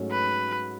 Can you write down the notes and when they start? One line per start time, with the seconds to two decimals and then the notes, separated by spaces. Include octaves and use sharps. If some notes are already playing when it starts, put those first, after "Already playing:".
Already playing: G#2 F#3 A3 C#4
0.11 B4